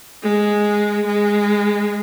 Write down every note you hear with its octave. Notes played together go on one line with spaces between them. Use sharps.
G#3
G#3